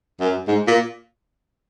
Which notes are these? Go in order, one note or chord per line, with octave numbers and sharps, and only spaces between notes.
F#2
G#2
A#2